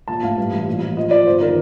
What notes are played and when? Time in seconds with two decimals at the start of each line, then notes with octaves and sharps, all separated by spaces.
0.08 A#1 A5
0.23 A2 F5
0.38 G2
0.52 A1
0.67 A#1
0.82 F3
0.97 F3 D#5
1.11 F3 D5
1.26 G1 C5
1.41 D#3 A#4